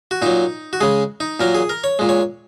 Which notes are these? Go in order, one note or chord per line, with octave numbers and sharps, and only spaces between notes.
F#4
A#2 F#3 D#4
F#4
C#3 G#3 G#4
D#4
A#2 F#3 A#4
G#4
A#4
C#5
A#2 G#3
C#5